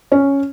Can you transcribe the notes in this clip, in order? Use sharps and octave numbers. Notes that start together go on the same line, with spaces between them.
C#4